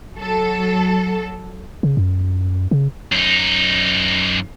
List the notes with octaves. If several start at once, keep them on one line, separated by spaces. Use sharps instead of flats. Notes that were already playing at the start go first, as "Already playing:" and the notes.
F#3 A4
C#3
F#2
C#3
F#2 D#4